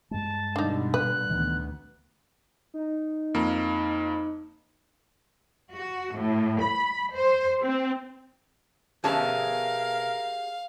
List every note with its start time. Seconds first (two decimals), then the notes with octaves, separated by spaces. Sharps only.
0.11 G2 G#3 A5
0.56 B2 D3 G3 D4 D#4
0.94 A#2 B4 F#6
1.29 D2 A#2 D#3 E3 B3
2.74 D#4
3.34 F2 A#3
5.70 F#4
6.15 A2
6.60 B5
7.13 C5
7.61 C4
9.04 B2 C#4 G4 G#4 A#4 E5 F5 A5